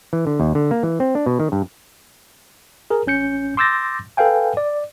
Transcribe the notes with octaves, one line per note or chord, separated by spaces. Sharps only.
E3
D3
D#2
D3
A#3
E3
C4
D4
B2
D#3
G2
G#4 A#4
A1 C#4 G6 C#7
C6 D6 E6 G6 A6 A#6
A4 B4 F5 G5 G#5
D5